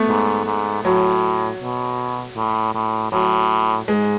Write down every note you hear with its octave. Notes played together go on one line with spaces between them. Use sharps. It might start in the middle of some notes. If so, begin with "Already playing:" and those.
Already playing: A3 B3
G#2
G#2
A2 F#3
B2
A2
A2
A2 F#3
G#2 G#3